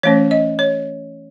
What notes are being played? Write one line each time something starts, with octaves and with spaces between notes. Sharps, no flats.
E3 A3 C#4 C#5
D#5
C#5